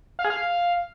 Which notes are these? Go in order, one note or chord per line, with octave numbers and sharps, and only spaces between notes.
F5
G#4
F5